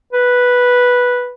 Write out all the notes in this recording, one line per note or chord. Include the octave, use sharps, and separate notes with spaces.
B4